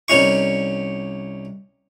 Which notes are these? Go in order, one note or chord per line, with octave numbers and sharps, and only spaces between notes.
C2 C#4 D#4 C#6